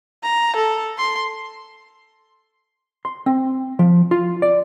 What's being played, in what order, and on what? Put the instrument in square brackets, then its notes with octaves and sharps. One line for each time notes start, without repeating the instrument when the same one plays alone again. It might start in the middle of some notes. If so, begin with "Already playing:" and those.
[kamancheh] A#5
A4
C6
[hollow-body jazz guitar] C6
C4
F3
F4
D5